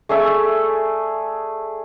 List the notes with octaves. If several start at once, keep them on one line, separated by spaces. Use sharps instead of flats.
A3 G#4 D5 E5